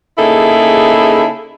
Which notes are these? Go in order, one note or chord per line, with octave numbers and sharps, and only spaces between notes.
C#3 A#3 D#4 E4 G#4 A4